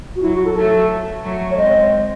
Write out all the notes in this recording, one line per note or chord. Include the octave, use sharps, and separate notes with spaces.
F#4
F#3 E4
F#4
A4
F#3 A3 A4
F#3 A3
C#5
G#3 C4 D#5